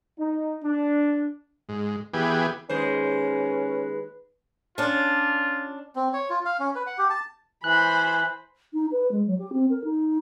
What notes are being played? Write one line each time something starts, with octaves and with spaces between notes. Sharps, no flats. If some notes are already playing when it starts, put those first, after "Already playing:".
D#4
D4
G#2
E3 B3 G4 G#4
D#2 G#3 C#4 B4 C5
C#4 D4 F4
C4
C#5
F4
F5
C#4
B4
F#5
G4
A5
E3 C5 G#5 B5 F#6
D#4
B4
G#3
F#3
G4
C4
A#4
D#4